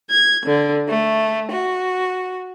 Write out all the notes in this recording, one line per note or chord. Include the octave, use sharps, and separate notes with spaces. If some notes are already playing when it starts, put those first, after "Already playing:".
G#6
D3
A3
F#4